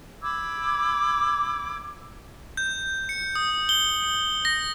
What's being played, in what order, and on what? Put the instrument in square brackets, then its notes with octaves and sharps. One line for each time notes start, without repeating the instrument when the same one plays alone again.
[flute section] B5 D6 E6 G#6
[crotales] G6
C#7
D#6
G7
C#7
A#6